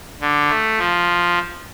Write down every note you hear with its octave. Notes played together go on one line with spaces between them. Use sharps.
D3
A3
F3